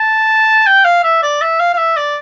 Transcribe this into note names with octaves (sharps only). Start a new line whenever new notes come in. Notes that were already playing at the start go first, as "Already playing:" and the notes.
Already playing: A5
G5
F5
E5
D5
E5
F5
F5
E5
D5